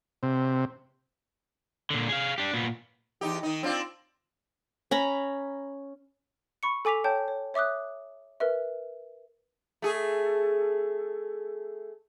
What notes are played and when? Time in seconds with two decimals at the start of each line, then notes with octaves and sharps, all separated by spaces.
0.23 C3
1.90 A#2 D3
2.09 G#4 F5
2.38 D4 G4
2.53 A#2 B3
3.21 E2 D#4 G4
3.43 D#3 D#4
3.63 C4 D4 F4
4.91 C#4 A#5 B5
6.63 B5 C#6 C#7
6.85 A4 G#5 D6 B6 F7
7.04 C#5 G5 A5 G6
7.28 C#5
7.54 C#5 E5 D6 D#6 F#6
8.40 A#4 B4 E5
9.82 A3 G#4